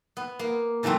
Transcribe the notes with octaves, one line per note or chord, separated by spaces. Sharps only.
B3
A#3
C#3 E3 F#3 A3 C4